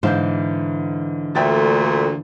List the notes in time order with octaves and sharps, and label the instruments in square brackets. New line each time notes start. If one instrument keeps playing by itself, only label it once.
[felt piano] G#2 F5 G6 [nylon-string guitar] D3 E3 C5
[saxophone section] D2 A#2 A3 [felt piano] E5 G5 A6